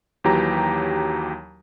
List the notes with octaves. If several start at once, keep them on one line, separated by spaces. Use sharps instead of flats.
D#2 E3 F#3 G4 A#5